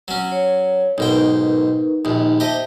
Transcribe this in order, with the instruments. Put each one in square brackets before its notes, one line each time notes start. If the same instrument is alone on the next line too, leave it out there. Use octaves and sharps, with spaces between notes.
[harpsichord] F#3 C#4
[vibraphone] C#5
[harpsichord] B1 G#2 G5 [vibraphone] D#4 A#4 B4
[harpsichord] A#1 D#2 [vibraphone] D#4
[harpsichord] G4 D#5 [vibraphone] C5 E5 A5